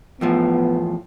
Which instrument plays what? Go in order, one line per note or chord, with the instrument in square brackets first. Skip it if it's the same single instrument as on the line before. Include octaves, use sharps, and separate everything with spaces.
[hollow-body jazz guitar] E2 A2 F3 [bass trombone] B3